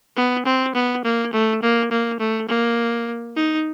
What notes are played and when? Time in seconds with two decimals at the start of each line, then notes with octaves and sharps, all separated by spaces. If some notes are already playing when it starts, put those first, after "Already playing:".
0.16 B3
0.45 C4
0.75 B3
1.04 A#3
1.33 A3
1.62 A#3
1.91 A#3
2.20 A3
2.48 A#3
3.36 D#4